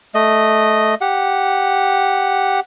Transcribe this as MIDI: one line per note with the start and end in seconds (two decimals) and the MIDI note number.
0.15 0.95 57
0.15 0.95 75
1.01 2.60 67
1.01 2.60 78